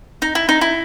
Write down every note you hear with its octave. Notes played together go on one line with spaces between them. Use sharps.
D#4
E4
D#4
E4